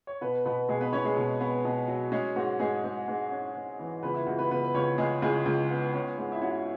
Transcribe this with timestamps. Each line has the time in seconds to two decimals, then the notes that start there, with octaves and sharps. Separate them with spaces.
0.07 C#5
0.21 B2 B3 B4
0.45 B2 B3 B4
0.69 B2 G#3 G#4
0.81 B3 B4
0.93 B2 C#4 C#5
1.05 G#3 G#4
1.17 B2
1.41 B3
1.65 B2
1.88 F#3
2.12 G#3 C#4 G#4
2.36 G#2 F#4
2.59 G#2 G#3 G#4
2.84 G#2
3.08 G#2
3.31 C#4
3.56 G#2
3.79 E3
4.03 C#2 B3 B4
4.14 E4
4.27 C#2 F#4
4.39 B3 B4
4.50 C#2 B3 B4
4.64 B4
4.74 C#2 C#4 C#5
4.98 C#2 G#3 G#4
5.22 C#2 G#3 G#4
5.45 C#2
5.70 B3
5.94 C#4
6.18 G#2
6.32 E4
6.41 C#4 F#4